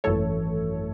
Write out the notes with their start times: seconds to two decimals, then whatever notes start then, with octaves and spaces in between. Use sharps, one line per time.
0.04 G#1 F#2 E3 A3 A4 C#5